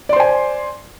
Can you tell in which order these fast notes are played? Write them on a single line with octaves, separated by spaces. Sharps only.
D5 C6 C5 G#5